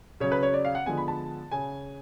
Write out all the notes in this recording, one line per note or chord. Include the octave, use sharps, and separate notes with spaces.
C#3 F#3 C#4 C#5
B4
C#5
D5
F5
F#5
D3 F3 G#3 B3 G#5
B5
A5
C#3 G#5